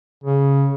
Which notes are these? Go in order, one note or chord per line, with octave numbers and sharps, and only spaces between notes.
C#3